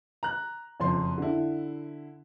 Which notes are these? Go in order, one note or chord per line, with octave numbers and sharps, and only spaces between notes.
A#5 F#6
F#1 F2 F3 C6
D3 E4